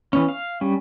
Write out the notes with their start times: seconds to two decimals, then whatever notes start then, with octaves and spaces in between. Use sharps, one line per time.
0.13 E3 B3 C#4
0.28 F5
0.61 G3 C#4